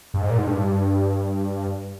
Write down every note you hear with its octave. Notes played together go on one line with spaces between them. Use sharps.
G2
G#2
A#2
G#2
G2